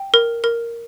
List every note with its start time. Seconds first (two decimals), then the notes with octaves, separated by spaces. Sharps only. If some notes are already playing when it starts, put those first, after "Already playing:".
Already playing: G5
0.14 A#4
0.44 A#4